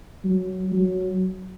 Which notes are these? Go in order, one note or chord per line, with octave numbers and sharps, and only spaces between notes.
F#3
F#3